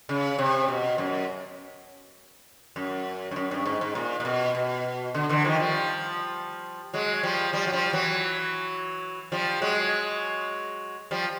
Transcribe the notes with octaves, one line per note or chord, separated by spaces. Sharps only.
C#3
C3
B2
F#2
F#2
G2
F#2
G2
G#2
G#2
A#2
A#2
B2
B2
D3
D3 E3
D#3 F3
F3 G3
F#3 G#3
F3 G3
F3 G3
F#3
F3 G3
E3 F#3
F3 G3
F#3 G#3
F3 G3